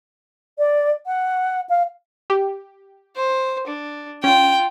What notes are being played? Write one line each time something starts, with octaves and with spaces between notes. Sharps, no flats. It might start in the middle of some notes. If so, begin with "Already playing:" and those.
D5
F#5
F5
G4
C5
D4
C#4 F4 G5